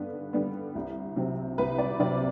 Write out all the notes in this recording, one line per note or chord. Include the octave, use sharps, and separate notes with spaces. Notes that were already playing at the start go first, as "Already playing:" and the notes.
Already playing: G2 D3 G3 B3
D3 G3 B3
C2
C3 F#3 C4
C2 B4
D5
C3 F#3 C4 D5